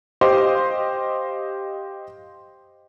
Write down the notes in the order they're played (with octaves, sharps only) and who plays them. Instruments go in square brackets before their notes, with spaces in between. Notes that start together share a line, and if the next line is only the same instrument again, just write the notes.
[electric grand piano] G4 C5 D#5 F5 C6 D6